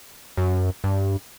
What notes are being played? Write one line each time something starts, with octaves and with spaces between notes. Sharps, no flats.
F#2
G2